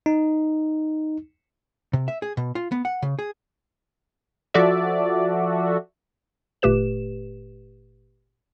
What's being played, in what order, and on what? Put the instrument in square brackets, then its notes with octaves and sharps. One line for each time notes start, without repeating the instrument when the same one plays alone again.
[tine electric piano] D#4
[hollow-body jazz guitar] C3
E5
G#4
B2
F4
B3
F#5
C#3
G#4
[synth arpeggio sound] F3 F#4 A4 D5 E5
[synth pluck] G1 A#2 A3 G4 B4 E7